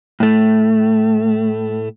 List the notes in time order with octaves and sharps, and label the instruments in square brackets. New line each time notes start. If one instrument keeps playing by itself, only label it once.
[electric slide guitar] A2 A3